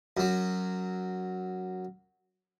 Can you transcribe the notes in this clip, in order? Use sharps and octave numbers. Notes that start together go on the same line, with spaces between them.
F#2 F#3